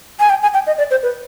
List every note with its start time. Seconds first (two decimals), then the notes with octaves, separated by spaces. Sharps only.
0.20 G#5
0.30 G5
0.42 G#5
0.54 G5
0.67 D#5
0.78 D5
0.91 C5
1.03 B4